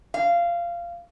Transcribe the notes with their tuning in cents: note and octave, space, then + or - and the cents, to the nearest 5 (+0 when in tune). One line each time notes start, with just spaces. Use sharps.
F5 -15